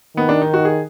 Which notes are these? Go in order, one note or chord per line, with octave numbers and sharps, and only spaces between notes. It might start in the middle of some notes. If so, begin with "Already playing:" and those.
D#3 B3
D4
D#4
F#4
G#4